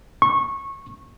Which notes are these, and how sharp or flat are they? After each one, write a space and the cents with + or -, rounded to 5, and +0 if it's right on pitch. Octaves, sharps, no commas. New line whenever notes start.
C#6 -20